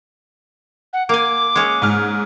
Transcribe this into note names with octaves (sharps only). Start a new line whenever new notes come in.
F#5
A#3 G#5 D6
G#3 C#4
G#2 F6